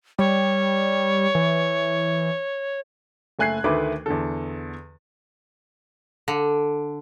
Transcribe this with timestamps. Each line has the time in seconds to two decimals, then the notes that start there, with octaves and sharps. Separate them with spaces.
0.19 G3 C#5
1.35 E3
3.39 F#1 A3 G#5 F#6 G#6 C7
3.64 D2 D#3 A3 B4 D6
4.06 E2 D3 A4
6.28 D3